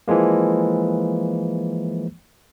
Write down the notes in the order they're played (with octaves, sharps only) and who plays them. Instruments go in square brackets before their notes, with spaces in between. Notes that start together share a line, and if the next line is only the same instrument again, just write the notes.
[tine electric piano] E3 F3 G#3 A#3